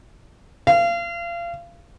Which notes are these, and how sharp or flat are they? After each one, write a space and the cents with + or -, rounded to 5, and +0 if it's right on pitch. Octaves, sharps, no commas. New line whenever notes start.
F5 -30